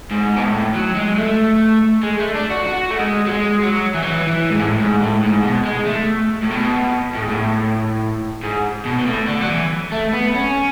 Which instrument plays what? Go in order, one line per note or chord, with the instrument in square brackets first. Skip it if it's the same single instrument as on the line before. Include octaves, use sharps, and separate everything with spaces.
[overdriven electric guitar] G#2
B2
A2
F#3
G#3
A3
G#3
A3
D4
F#4
F#4
A3
G#3
F#3
G#3
F#3
E3
F#3
E3
E3
G#2
A2
G#2
A2
G#2
B2
G#3
A3
A2
B2
A2
G#2
A2
G#2
B2
B2
A2
D3
F#3
E3
A3
B3
C#4